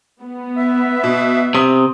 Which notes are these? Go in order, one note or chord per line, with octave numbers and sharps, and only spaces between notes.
B3
B4 E5
B2
C3 D#6